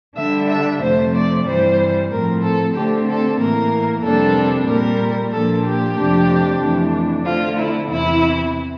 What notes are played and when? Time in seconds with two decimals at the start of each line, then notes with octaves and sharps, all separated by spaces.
0.16 D3 G3 D4 E5
0.49 E5
0.81 F2 C3 F3 A3 C5
1.14 D5
1.45 G2 E3 G3 C5
2.10 A2 F3 C4 A#4
2.42 A4
2.75 D3 A3 C4 G4
3.07 A4
3.39 A2 E3 A#3 A#4
4.03 F2 C3 G3 A#3 D4 A4
4.68 A#2 G3 A#3 A#4
5.33 A#2 F3 A#3 D4 A4
5.65 G4
5.97 F2 C3 F3 A3 D4
6.61 F2 E3 A3 D4
7.25 D3 A3 C4 F4
7.58 E4
7.90 E2 C3 E3 E4